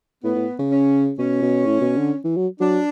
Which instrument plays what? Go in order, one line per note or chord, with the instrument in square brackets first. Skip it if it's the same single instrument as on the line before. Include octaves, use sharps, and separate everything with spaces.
[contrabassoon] A2 [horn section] B3
[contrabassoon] A2
C#3
[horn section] C#4
[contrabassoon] B2 [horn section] C#4
[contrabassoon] B2
A2
B2
D3
E3
F#3
[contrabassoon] F#3 [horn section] D4